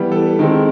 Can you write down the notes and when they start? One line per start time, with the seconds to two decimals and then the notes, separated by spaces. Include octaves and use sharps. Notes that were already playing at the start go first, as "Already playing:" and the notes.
Already playing: E3 G3 B3
0.12 A4
0.39 D#3 G#3 C4